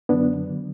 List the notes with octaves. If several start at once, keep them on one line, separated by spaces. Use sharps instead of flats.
F#2 D3 F#3 B3 D4
D3 F#3